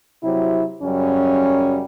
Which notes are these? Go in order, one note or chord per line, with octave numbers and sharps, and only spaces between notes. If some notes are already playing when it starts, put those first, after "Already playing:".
C3 F#3 E4
F#2 C#3 F#3 G3 C#4